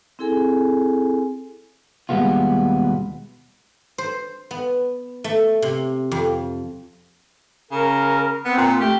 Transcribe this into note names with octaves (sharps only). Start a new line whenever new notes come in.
C4 E4 G#4 A4 G#5
D#2 B2 G3 G#3 B3 F4
C5
B3
A3
C3
F2
C#3 A#4
B3 C4
A#2
A3 G4